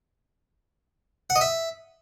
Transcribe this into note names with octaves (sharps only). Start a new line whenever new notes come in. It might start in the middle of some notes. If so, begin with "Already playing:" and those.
F#5
D#5
E5